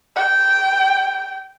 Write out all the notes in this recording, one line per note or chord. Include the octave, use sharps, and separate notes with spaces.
G5